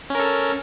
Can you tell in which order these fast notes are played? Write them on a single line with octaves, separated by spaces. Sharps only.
C#4 A#4 A4